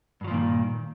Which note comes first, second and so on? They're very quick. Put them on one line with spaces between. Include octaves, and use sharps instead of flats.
G2 F#3 F3 A#2 D#3